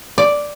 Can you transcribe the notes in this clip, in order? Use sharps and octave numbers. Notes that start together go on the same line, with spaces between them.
D5